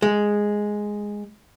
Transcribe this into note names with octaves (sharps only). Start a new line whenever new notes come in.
G#3